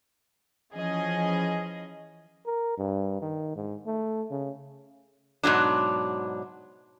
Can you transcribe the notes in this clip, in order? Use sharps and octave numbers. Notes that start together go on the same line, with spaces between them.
E3 F3 C#4 G#4 D#5
A#4
G2
D#3
G#2
A3
C#3
G#2 B2 F#3 D4